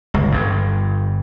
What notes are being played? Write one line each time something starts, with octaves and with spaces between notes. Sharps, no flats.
G1 C#2
G1 G2